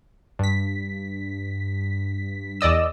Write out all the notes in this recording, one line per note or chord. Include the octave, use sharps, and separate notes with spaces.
G2 B6
E2 D5 D#5 E6